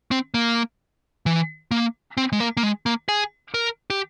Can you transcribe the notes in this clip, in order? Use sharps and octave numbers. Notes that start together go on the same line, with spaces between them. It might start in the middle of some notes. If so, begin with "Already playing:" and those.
C4
A#3
E3
A#3
C4
G#3
A#3
A#3
G#3
A#3
G#4
A#4
G4